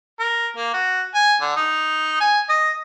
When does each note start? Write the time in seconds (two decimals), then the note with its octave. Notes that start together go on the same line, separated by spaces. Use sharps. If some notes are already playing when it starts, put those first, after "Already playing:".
0.20 A#4
0.57 A#3
0.74 F#4
1.15 G#5
1.41 D3
1.56 D#4
2.20 G#5
2.49 D#5